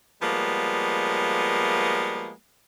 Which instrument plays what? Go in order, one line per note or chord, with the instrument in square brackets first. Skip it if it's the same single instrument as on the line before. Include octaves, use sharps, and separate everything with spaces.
[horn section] F3 G3 G#3 A#3 B3